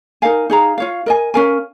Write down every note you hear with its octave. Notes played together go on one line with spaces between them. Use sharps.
D#4 A#4 F5 G#5
D#4 G#4 F5 A#5
F4 C#5 F5
A#4 D#5 G#5
C#4 A#4 F5 G#5